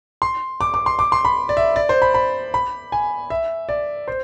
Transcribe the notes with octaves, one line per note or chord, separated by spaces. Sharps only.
C6
D6
D6
C6
D6
C6
B5
D5
E5
D5
C5
B5
B5
B5
G#5
E5
D5
C5